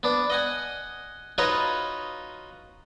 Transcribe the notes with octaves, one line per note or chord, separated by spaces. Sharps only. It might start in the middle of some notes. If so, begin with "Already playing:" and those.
B3 D4
D#5 F#5 G#5
D#4 F4 F#4 B4 C#5 D#5